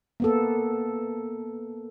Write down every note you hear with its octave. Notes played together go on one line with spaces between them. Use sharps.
A#3 B3 A4